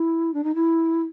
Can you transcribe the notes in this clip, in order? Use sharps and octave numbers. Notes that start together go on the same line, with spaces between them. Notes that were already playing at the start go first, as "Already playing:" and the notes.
Already playing: E4
D4
D#4
E4